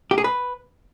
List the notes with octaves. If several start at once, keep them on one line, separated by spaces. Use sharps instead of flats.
G4
G#4
B4